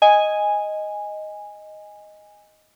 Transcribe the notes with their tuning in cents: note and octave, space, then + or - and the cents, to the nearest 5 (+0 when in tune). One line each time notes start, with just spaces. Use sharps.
D#5 +0 G#5 -10